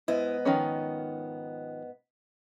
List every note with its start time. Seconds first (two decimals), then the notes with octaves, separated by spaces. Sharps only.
0.08 G#2 B3 E4 D#5
0.45 D#3 F3 C#4